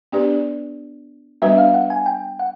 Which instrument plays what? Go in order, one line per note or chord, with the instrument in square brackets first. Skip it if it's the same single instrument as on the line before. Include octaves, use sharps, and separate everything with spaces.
[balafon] B3 D4 G4 B4 D5
[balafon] G3 B3 D4 F#4 B4 [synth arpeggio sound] E5
[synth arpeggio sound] F5
F#5
G#5
G5
F#5